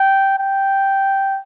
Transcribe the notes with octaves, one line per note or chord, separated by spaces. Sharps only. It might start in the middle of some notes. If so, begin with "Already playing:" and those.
Already playing: G5
G5